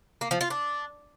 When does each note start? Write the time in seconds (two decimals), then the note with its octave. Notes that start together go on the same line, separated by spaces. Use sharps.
0.21 A#3
0.31 F3
0.41 F4
0.50 D4